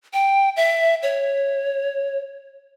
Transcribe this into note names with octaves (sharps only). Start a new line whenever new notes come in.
G5
E5
C#5